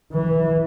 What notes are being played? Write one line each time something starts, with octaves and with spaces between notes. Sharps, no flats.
E3